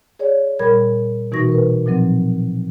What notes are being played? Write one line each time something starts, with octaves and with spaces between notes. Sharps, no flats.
G#4 C#5 D5
A#2 G3 A#4 B5 G#6
B2 E3 D#4 F#4 C#6 A#6
A#4 B4
A#2 F3 F#3 C4